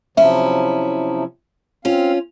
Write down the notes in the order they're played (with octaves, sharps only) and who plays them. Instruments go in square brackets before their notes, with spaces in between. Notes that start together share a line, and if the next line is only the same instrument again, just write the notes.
[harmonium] C3 F3 F#3 [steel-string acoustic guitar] C#4 E4 [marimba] E5
[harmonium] C4 F5 [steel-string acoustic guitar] C#4 F4